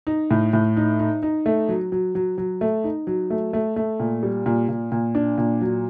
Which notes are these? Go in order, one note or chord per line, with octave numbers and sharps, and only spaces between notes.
D#4
A2
A2
D#4
D#4
D#4
A3
F#3
F#3
F#3
F#3
A3
D#4
F#3
A3
A3
A3
A#2
G3
A#2
A#2
A#2
D4
A#2
F#3